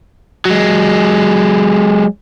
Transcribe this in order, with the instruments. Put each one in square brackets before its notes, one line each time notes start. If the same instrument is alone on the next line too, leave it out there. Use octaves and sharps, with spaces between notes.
[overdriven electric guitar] F#3 G#3